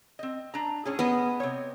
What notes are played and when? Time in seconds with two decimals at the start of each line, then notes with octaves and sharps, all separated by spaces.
0.19 C4 D#5
0.54 D4 A#5
0.85 A2 C#4 G#4
0.99 B3 D#5
1.40 C3 C#5